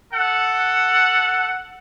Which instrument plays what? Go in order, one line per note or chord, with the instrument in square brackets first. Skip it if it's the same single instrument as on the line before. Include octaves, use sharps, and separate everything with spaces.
[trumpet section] A4 F#5